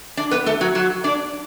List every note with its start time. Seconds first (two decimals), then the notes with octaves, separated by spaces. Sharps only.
0.17 D4 D5
0.31 B3 B4
0.46 A3 A4
0.61 F#3 F#4
0.75 F#3 F#4
1.04 D4 D5